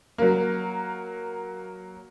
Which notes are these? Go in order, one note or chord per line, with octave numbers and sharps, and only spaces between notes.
F#3 A#3